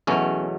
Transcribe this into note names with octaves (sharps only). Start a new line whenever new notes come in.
E2 B2 F#3 A3 C#4